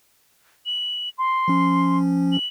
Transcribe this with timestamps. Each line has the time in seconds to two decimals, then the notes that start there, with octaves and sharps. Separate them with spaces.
0.66 F#7
1.18 C6
1.48 F3 C#4
2.32 F#7